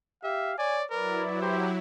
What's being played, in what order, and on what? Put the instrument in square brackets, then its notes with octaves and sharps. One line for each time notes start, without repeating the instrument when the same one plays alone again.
[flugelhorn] G4 [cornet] E5 [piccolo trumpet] F5
[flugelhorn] C#5 [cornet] D5 [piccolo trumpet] G#5
[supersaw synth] F#3 E4 [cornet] A#4 [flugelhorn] B4 [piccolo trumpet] D5
[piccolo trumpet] G4 [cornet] C5